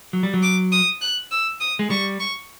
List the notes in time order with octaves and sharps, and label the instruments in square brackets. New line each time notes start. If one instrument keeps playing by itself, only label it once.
[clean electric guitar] F#3
G3
F#3
[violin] D6
D#6
F#6
E6
D#6
[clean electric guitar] G#3
[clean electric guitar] G3 [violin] C#6
[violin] C#6